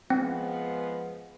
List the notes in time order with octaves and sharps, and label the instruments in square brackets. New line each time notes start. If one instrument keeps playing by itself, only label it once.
[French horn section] F3 G#3 B3 [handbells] C4